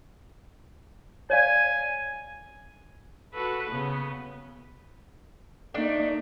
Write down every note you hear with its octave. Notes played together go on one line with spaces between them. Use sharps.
C#5 D5 F5 G#5
F#4 A4 B4
C#3 B3
A3 A#3 D4 D#4 D5